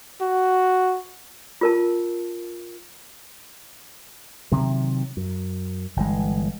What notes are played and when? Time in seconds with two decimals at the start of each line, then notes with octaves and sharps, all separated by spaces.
0.21 F#4
1.61 F4 A#4 A5
4.52 C3 D#3 F#3
5.17 F#2
5.96 G1 E3 G#3